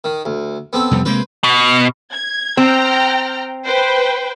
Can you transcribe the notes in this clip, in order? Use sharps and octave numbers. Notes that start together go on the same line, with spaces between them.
D#3
D2
B3 C4 A4
F2 C3 G3
C3 G#3 A#3 B4 C5
B2
G#6
C4 G5 A#5 F6
B4 C5 G5